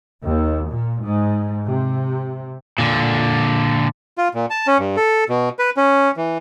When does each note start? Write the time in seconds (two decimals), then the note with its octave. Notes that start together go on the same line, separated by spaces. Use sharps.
0.23 D#2
0.68 A#2
1.03 G#2
1.66 C3
2.78 A#2 D3
4.18 F4
4.34 A#2
4.50 A5
4.67 C#4
4.79 G2
4.97 A4
5.29 B2
5.59 B4
5.77 C#4
6.17 E3